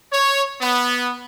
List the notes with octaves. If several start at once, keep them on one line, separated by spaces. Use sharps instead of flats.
C#5
B3